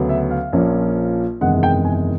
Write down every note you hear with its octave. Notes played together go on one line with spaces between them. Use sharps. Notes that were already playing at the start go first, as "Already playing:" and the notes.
Already playing: D2 C#3 F#3 B3
E5
F5
A#1 A#2 F3 A#3 C#4
F#1 E2 C3 D#3 G#3 F#5
G5
G#5